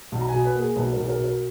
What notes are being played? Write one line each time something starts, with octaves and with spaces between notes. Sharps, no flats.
B1
A#5
G#5
B2
B4
A#3
G#4
B1 B4
B1 A#4
G#4
A#4
B2
A#4